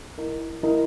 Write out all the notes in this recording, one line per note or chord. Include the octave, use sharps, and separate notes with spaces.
E4 A#4 D#5 A#5
E4 A#4 D#5 A#5